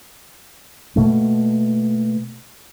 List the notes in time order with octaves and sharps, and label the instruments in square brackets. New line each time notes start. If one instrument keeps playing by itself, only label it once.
[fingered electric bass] B2 A3 A#3